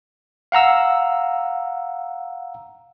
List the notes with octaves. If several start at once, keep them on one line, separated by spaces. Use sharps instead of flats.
F5 F#5 A#5 E6